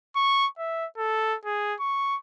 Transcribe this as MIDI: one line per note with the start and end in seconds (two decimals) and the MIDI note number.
0.16 0.47 85
0.58 0.86 76
0.98 1.36 69
1.45 1.75 68
1.80 2.16 85